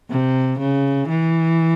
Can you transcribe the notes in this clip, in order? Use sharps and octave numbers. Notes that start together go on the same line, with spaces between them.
C3
C#3
E3